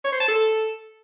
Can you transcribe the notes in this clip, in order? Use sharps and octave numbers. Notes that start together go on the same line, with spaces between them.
C#5
C5
A5
A4